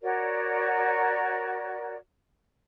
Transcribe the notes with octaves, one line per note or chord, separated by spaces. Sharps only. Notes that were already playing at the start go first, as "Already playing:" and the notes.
F#4 A#4 C#5 D5